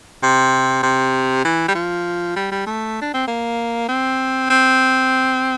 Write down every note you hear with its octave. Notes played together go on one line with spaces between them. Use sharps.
C3
C3
E3
G3
F3
G3
G3
A3
D4
C4
A#3
C4
C4